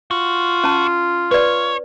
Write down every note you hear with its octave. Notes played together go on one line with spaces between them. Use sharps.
F4 F#4
C#4 A5
B4 C#5 D5